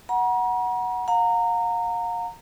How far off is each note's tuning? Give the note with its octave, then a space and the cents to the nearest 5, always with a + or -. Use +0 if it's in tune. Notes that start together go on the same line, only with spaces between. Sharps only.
F#5 +0 A#5 +40
F5 +45 A#5 -20